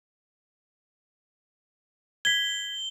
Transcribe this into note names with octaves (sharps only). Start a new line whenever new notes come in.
G#6 B6 G7